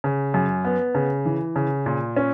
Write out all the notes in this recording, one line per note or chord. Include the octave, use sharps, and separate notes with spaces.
C#3
F#2
B3
C#3
E3
C#3
A#2
C#4